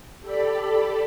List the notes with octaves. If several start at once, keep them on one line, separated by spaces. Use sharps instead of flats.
G4 A4 D5 B5